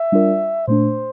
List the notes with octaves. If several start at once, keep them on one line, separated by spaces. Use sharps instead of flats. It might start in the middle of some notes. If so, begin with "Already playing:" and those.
Already playing: E5
G3 D4 F4 A#4 D5
A#2 A3 D4 C5